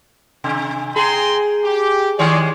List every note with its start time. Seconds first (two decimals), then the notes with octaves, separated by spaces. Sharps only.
0.44 C3
0.96 G#4 G5 A#5 C6
1.65 G4
2.19 D#3 G#3 G#4 C#5 D5